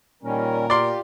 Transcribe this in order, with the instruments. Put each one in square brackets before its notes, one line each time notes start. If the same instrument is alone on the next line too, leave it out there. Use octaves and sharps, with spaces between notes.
[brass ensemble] A#2 A#4 [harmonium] D#3 G3 C#4
[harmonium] F4 G4 [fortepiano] D5 C6